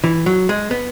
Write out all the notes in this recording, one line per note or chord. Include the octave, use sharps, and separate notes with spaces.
E3
F#3
G#3
B3